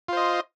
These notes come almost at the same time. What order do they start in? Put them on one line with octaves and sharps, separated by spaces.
F4 C5 D#5